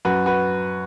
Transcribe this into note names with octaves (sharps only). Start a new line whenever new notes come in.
F#2 F#4 B4
F#4 B4